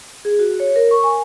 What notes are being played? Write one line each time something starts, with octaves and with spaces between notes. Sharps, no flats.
G#4
F#4
C#5
A#4
C#6
G#5